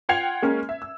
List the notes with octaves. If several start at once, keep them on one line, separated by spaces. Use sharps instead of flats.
F4 F#5 G5 G#6 C7 F7
G#3 A#3 C#4
E5
E6